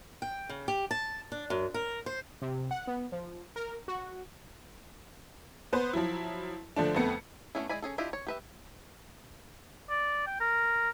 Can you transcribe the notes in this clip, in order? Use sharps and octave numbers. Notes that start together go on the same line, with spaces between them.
G5
C#3
G4
A5
D4
F#2
A#4
C5
C3
F#5
B3
F3
A#4
F#4
B3 B4 C5
F3 F#3 E4
D3 F3 A3 D4
F2 A3 B3 C#7
A3 B3 C#4 D4 E4
G#3 E4 D5 G#5 B5
C#4 G#4 A4
D4 E4 F4 G4 D#5
C#5
G4 B4 E5
D5
G5
A#4